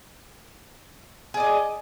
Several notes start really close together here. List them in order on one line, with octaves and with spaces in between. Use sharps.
G#4 D5 D#5